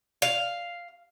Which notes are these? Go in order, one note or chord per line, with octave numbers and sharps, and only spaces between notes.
F5